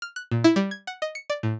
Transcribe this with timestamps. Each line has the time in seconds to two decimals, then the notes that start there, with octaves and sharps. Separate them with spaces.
0.02 F6
0.16 F#6
0.32 A#2
0.44 E4
0.56 G3
0.71 G#6
0.87 F#5
1.02 D#5
1.15 C#7
1.30 D5
1.43 A2